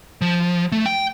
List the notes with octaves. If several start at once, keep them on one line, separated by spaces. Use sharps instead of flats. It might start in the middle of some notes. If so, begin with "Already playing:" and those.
F3
A3
G5